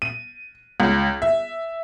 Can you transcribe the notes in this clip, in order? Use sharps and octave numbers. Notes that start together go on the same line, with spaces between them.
D#7
C#2
E5